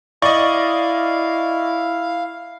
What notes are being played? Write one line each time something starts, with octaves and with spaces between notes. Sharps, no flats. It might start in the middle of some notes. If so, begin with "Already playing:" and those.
E4 D5 D#5 F5 C#6